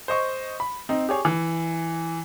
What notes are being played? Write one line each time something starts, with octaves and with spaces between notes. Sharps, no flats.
C5 D#5 C#6
B5
C4 D#4
G4 G#4 C#5
E3